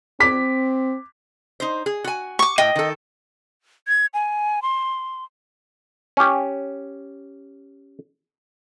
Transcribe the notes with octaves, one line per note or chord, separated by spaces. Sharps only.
C4 D6 B6
D#4 C5
G#4
F#4 G#5
C#6 D6
A2 D#5 G5
D#3 A4
G#6
G#5
C6
C#4 G4